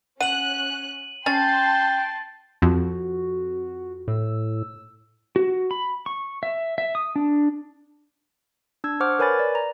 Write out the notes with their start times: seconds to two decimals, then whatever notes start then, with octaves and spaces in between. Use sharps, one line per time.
0.21 C#4 F#5 F#6 D#7 F#7
1.26 C#4 G5 A5 C6 A6
2.62 F2 F#4
4.08 A2 E6
5.36 F#4
5.71 B5
6.06 C#6
6.43 E5
6.78 E5
6.95 D#6
7.16 D4
8.84 D4 E6 G#6
9.00 C5 F#5 C#6 D6 F6
9.19 A#4 B4 C#5 G#5 B5 A6
9.39 D5
9.55 A#5